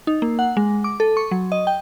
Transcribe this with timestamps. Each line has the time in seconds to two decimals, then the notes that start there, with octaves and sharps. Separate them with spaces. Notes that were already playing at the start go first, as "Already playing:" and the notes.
0.07 D#4
0.22 A#3
0.39 F#5
0.57 G#3
0.84 D6
1.00 A4
1.17 C#6
1.31 F#3
1.52 D#5
1.67 G5